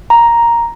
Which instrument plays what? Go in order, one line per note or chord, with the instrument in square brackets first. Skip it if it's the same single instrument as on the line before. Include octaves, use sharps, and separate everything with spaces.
[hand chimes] A#5